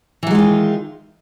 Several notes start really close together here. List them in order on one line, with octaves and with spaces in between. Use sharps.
E3 F#3 G#3 F4 D#3